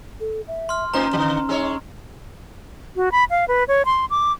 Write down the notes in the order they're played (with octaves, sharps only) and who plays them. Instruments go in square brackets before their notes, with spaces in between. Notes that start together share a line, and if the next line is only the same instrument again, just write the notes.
[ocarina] A4
E5
[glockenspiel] C6 F6
[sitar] A2 D#4 C5 [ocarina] C#4 [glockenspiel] A#5
[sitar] D3 F3
G#3 D#4 C#5
[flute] F#4
B5
F5
B4
C#5
C6
D6